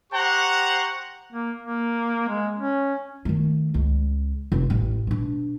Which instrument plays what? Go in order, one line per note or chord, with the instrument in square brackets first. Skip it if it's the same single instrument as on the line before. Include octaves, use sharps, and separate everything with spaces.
[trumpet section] G4 C5 F#5 A#5 C#6
[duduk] A#3
A#3
G#3
C#4
[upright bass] D#3 A3
C#2
F1 C3
A1
B2 D4